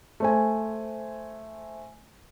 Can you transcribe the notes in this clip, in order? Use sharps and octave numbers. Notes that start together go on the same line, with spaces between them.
A3 C5 G#5